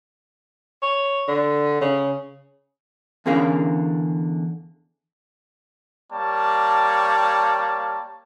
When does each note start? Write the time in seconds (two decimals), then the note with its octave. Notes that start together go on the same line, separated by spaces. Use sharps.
0.82 C#5
1.28 D3
1.81 C#3
3.26 E2 D3 C#4 G#4 A#4 F5
6.12 G3 A#3 C#5 A5